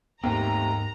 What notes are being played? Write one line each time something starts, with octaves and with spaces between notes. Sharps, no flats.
D#2 G#2 A3 B3 C4 G4 A#5